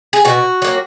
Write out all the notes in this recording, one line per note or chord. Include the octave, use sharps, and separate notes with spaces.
G#4
B2 F#4
F#3 A#3